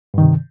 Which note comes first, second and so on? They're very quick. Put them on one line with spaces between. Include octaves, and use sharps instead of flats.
G2 D#3 C3